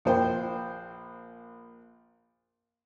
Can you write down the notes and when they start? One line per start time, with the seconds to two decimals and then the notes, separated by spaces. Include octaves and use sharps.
0.05 A#1 C5 G5